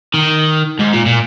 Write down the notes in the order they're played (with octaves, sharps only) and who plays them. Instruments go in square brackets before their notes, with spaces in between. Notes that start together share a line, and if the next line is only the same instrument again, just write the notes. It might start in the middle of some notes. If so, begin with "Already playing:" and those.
[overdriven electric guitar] D#3
G#2
A#2
A#2